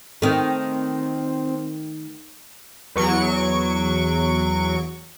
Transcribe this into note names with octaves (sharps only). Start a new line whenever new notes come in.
D#3 A3 C4
E2 F#3 C#6 D7